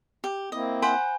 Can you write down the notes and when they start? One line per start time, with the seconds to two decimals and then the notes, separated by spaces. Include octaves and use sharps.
0.24 G4
0.52 A#3 C4 E4 D#5
0.82 C5 F#5 G#5 B5